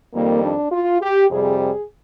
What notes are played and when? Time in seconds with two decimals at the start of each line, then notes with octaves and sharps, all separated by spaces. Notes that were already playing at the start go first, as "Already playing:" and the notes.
0.13 F2 D#3 G3 A#3
0.43 D4
0.72 F4
1.01 G4
1.29 F2 C3 G3 G#4
1.58 G#4